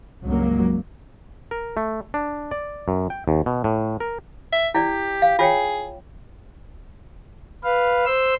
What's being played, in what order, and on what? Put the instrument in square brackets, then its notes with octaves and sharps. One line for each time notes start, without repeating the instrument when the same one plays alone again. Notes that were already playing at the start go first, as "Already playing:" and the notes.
[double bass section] C#2 G2 F#3 A#3
[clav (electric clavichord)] A#4
A3
D4
D5
F#2
G5
D#2
B2
A2
A#4
[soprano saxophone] E5
[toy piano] E4 D5 [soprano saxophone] G4
[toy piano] F5
[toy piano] F4 C#5 G5 [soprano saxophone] G#4
[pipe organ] B4 F5
C5 C6 E6